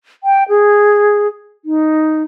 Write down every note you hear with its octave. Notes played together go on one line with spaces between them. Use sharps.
G5
G#4
D#4